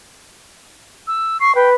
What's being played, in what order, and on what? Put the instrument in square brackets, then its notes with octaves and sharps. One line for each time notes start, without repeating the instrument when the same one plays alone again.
[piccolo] E6
[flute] C#6 [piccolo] C7
[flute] B4 [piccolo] G5